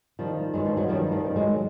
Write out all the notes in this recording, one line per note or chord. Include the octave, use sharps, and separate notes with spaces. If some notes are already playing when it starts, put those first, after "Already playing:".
D#3 F3 G3
G2 F#3 G#3
F3
F#3
D#3 F3 G3
F3 G3
D#3
F#3 G#3